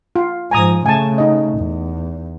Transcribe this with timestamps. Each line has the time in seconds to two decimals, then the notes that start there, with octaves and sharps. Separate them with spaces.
0.16 F4
0.51 G#2 F3 G#5 A#5 D#6
0.86 C#3 A3 G#5 A5
1.18 D#4 D#5
1.59 E2